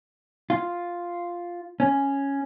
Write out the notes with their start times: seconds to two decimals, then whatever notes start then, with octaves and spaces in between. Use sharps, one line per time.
0.50 F4
1.80 C#4